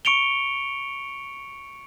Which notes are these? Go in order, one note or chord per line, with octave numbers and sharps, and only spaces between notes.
C#6 C#7 D7 F7 G7